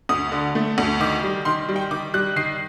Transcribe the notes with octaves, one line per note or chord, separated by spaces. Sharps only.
D2 D#6
D3
A3
D2
D#3 D6
G3
D#3 C6
G3
G5
D#3 D6
G3 F#6
D#3 C7